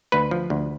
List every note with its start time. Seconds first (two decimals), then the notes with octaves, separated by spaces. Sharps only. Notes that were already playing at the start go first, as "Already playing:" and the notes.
0.12 D2 B4
0.31 F3
0.50 D2